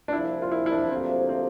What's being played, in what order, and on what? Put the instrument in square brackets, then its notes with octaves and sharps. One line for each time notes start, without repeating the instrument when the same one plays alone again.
[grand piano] D4
[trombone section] C2 A#2 F3 [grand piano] E4
[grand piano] F4
E4
E4
D4
[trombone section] D2 C3 F3 A#3 [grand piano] C4
[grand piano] C4